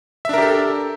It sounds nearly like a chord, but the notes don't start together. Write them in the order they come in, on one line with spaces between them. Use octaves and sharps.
E5 D4 A#4 G4 A4